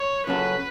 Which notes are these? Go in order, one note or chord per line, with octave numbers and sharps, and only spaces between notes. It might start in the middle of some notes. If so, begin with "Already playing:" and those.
Already playing: C#5
C#3 F#3 C#4 F#4 A4 B4